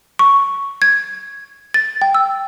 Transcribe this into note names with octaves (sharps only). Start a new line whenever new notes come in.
C#6
G#6
A6
G5
E6